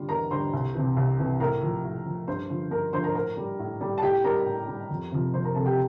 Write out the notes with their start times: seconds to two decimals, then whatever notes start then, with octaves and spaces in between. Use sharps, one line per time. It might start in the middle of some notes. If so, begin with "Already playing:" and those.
Already playing: D3 G3 F4
0.09 E2 A#4 A#5
0.31 D3 G3 C5 C6
0.53 C2
0.75 C3 E3
0.97 C2
1.19 C3 E3
1.40 A2 A#4 A#5
1.62 F3
1.84 A2
2.06 F3
2.28 G2 C5 C6
2.50 D3 F3
2.71 G2 A#4 A#5
2.93 D3 F3 C5 C6
3.04 A#4 A#5
3.15 A2 A#4 A#5
3.37 G3
3.59 A2
3.81 G3
3.98 A5
4.02 A2 G4 G5
4.24 G3 A#4 A#5
4.46 A2
4.68 G3
4.90 F2
5.12 C3 F3
5.34 F2 C5 C6
5.45 A#4 A#5
5.55 C3 F3 A4 A5
5.66 G4 G5